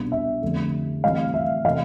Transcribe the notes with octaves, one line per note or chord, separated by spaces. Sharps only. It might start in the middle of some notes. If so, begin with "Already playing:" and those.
Already playing: C2 B2 G3 B3 D4
E5
F2 D3 A3 D4
A2 E3 G3 C4 F5
E5
C3 E3 A3 C4 F5